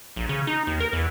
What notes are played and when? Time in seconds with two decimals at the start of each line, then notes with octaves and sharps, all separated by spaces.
0.16 A#1
0.29 C#3
0.47 D#4
0.67 D#2
0.80 A#4
0.93 E2